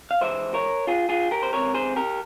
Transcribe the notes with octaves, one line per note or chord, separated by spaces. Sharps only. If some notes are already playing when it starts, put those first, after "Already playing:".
F5
G#2 E3 G#3 C5 E5
A#4 C#5
F4 G#4
F4 G#4
G4 A#4
C5
C#2 C3 E3 A#4 C#5
G#4 C5
G4 A#4